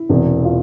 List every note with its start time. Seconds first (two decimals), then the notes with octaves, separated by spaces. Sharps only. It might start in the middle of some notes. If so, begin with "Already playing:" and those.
Already playing: E4
0.09 E1 E2 C3
0.45 F4